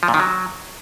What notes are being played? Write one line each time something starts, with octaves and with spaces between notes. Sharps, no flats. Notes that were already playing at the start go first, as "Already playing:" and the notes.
F3
A#2
D#3
F#3